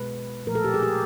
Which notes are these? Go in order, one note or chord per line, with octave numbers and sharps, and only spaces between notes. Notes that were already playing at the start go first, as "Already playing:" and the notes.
Already playing: B2 G#3 B4
A#2 F3 A3 A#4
A4
G4
G#4
G4